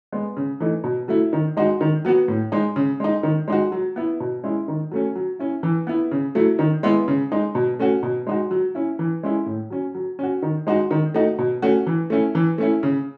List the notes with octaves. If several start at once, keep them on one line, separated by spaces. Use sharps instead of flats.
G#3 B3
C#3
E3 A3 D#4
B2
F#3 A3 E4
D#3
G#3 D#4 F#4
D#3
F#3 B3 F#4
A2
G#3 D#4
C#3
G#3 D#4
D#3
G#3 D#4 F#4
F#3
B3 E4
B2
G#3 C#4 E4
D#3
F#3 A3 C#4
F#3
C#4 E4
E3
B3 E4
C#3
F#3 A3 E4
D#3
G#3 B3 E4
C#3
G#3 D#4
B2
A3 C#4 F#4
B2
G#3 D#4 F#4
F#3
C#4 E4
E3
G#3 C#4 E4
A2
F#3 C#4
F#3
C#4 F#4
D#3
G#3 D#4 F#4
D#3
A3 D#4 F#4
B2
A3 C#4 F#4
E3
A3 C#4 E4
E3
A3 C#4 E4
C#3